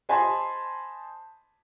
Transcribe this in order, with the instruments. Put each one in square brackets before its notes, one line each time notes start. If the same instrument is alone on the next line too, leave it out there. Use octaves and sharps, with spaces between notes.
[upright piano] C5 D#5 G#5 A5 B5 C6